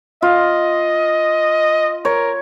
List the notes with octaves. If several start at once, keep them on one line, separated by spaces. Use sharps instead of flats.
F4 D#5
A#4 C#5